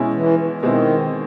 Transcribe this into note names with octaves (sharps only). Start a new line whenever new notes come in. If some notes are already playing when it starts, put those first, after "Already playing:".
Already playing: B2 G#3 C#4 E4
E3
B2 D#3 G#3 C4 E4